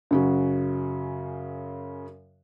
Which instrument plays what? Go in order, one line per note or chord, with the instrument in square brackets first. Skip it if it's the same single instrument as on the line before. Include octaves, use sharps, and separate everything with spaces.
[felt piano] F#2 C#3 F#4